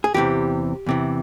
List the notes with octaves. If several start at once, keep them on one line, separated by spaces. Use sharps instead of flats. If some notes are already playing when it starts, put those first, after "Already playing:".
G#4
E2 C3 E3 G4
E2 C3 E3